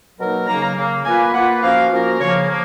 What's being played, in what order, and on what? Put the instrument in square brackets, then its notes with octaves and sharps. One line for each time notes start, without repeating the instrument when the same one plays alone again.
[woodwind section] B2 F#3 A#3 D#4 A#4
[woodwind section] C#3 F#3 A#3 [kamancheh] A#5
[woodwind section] C#3 F#3 A#3
[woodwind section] A#3 F4 B4 [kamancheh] G#5
[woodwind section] A#3 F4 B4 [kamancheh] F#5
[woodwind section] F3 A#3 C#4 F#4 A#4 [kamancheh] F5
[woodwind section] F3 A#3 C#4 F#4 A#4
[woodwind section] C#3 F3 A#3 [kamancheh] C#5
[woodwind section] F3 A#3